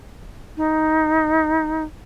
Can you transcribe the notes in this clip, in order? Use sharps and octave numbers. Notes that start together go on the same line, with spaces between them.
D#4